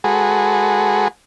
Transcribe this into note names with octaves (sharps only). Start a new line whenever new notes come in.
G#3 F#4 G#4 A4 B4